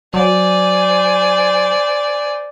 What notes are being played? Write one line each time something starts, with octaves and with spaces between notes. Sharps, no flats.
F#3 C5 D5 G#5